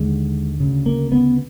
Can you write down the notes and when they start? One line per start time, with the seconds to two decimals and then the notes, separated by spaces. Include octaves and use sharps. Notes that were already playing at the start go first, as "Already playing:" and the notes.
Already playing: D#2 D3 G#3
0.60 D2 C#3
0.86 A#3
1.12 B3